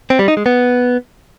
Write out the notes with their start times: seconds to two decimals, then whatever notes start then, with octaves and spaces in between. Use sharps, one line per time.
0.10 C4
0.19 G3
0.28 D#4
0.37 G#3
0.46 B3